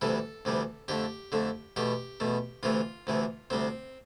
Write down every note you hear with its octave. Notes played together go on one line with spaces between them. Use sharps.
D2 C3 E3 G3 A4
D2 C3 E3 G3
F2 D3 A3 G4
F2 D3 A3
E2 B2 A3 G4
E2 B2 A3
D2 C3 E3 A3 F4
D2 C3 E3 A3
D2 C3 G3 C4